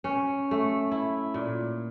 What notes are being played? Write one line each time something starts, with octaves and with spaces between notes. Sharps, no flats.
C#4
A3
E4
A#2